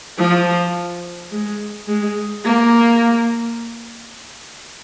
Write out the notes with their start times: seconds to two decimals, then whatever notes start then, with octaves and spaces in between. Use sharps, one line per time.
0.19 F3
1.32 G#3
1.88 G#3
2.45 A#3